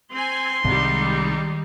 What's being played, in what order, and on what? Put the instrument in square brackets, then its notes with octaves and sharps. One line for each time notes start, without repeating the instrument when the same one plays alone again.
[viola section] C4 G#5 [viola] C6
[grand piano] C2 [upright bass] D#3 [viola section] G3 G#3 D#4